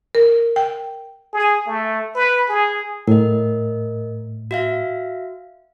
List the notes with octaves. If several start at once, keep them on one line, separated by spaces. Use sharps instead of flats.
A#4
G5
G#4
A3
B4
G#4
A2 A#4 D#5
F#4 E5 F5